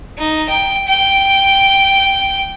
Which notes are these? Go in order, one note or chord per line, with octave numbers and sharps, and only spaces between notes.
D#4
G5
G5